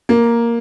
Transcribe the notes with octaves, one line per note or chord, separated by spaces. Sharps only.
A#3